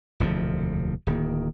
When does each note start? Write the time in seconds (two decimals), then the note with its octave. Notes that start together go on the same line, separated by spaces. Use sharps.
0.20 E1 D2 C3 F3
1.07 D1 D#3 A#3